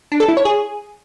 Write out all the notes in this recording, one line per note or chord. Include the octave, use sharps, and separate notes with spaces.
D4
A4
E4
C#5
G#4